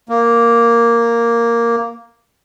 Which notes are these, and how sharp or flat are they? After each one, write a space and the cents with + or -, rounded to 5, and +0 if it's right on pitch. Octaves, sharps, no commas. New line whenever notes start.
A#3 +0